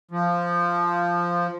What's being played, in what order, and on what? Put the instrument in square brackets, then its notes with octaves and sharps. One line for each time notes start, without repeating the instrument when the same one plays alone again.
[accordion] F3